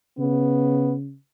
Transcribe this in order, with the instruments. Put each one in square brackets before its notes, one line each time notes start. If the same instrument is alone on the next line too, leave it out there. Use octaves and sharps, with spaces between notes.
[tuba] C#3 [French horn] B3